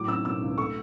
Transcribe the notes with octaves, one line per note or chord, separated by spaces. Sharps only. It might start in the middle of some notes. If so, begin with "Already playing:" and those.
Already playing: A2 F#3 D6
C#4 E6
B2 E6
C#2
A3 C#6